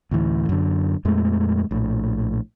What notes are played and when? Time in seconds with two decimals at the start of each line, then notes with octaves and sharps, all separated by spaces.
0.11 D2 A2 E3
0.49 F#2 D3
1.05 F2 A#2 G#3 A3
1.71 A#1 A2